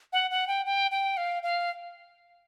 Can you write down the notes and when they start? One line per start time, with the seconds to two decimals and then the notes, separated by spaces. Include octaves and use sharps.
0.13 F#5
0.31 F#5
0.47 G5
0.66 G5
0.91 G5
1.17 F5
1.43 F5